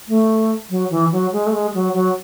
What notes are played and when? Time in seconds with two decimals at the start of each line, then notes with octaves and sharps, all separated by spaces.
0.08 A3
0.70 F#3
0.91 E3
1.12 F#3
1.32 G#3
1.47 A3
1.52 G#3
1.74 F#3
1.94 F#3